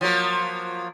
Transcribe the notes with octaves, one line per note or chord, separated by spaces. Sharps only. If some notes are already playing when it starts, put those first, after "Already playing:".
F3 F#3 A#3